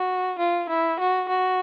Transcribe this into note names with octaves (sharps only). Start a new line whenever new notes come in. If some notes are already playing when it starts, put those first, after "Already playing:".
Already playing: F#4
F4
E4
F#4
F#4